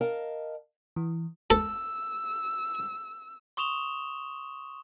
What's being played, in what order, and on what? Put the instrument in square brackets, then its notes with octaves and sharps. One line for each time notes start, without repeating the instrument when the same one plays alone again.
[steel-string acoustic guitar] A#4 D#5 F5 A5
[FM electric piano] E3
[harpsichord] A4 [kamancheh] E6
[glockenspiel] C6 C#6 D#6 E7 F7 G7